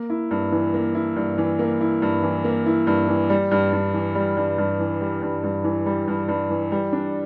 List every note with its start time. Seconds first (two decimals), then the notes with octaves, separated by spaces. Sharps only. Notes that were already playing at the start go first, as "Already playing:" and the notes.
Already playing: A#3
0.10 E4
0.31 G2
0.52 E3
0.74 A#3
0.95 E4
1.16 G2
1.38 E3
1.59 A#3
1.81 E4
2.02 G2
2.23 E3
2.45 A#3
2.66 E4
2.87 G2
3.08 E3
3.30 G3
3.51 G2
3.73 G2
3.94 E3
4.15 G3
4.37 G2
4.58 G2
4.80 E3
5.01 G3
5.22 G2
5.44 G2
5.64 E3
5.86 G3
6.08 G2
6.29 G2
6.50 E3
6.72 G3
6.93 D4